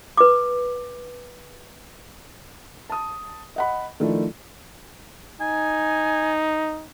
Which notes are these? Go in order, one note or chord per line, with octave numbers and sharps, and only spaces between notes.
B4 D6
A5 D#6
D#5 F#5 B5
D#3 F3 A3 D4 E4
D#4 G#5